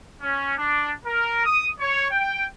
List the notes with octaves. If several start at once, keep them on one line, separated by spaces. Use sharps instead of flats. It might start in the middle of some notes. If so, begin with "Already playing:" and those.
C#4
D4
A#4
D#6
C#5
G5